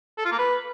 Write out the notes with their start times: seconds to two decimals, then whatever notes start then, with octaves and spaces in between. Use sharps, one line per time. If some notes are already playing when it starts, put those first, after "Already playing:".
0.18 A4
0.25 F4
0.32 A#3
0.39 B4